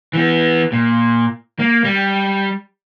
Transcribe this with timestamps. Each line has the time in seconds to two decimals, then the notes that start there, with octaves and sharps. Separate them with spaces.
0.13 E3 B3
0.72 A#2
1.59 A#3
1.84 G3